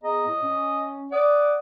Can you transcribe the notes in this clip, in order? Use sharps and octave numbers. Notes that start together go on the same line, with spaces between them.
B3 G#4 D#5 A#5
A2
C#4
D5 F#5 D#6